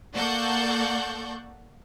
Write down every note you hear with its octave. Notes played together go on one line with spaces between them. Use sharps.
A#3 A4 D5 F#5 C#6 G6